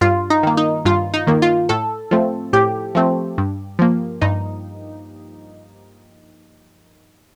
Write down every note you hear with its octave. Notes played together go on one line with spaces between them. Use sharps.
G2 F4
D#4
D#3 A#3
D#4
G2 F4
D#4
D#3 A#3
F4
A2 A4
F3 A3 C4
A2 G4
F3 A3 C4
G2
F3 A#3
G2 D#4